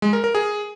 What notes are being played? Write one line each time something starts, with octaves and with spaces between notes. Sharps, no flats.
G#3
A#4
A#4
G#4